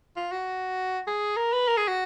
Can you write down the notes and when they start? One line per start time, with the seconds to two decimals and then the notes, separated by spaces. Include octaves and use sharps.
0.16 F4
0.32 F#4
1.07 G#4
1.36 A#4
1.52 B4
1.68 A#4
1.78 G#4
1.88 F#4